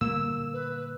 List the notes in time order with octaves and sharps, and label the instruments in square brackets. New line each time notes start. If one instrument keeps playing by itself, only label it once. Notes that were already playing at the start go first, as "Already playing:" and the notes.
[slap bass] A#2 D3 G3 [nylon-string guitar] A#3 [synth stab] E6
[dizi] B4